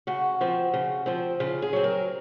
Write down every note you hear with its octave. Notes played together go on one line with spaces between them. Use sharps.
C#3 F#4
F3 C4
C#3
F3 C4
C#3 F4
G#4
F#3 C4
A#4